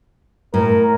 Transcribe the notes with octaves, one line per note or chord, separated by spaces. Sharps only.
A2 A#4